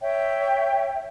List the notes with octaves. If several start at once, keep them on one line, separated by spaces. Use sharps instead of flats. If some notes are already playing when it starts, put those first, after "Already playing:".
C#5 E5 G5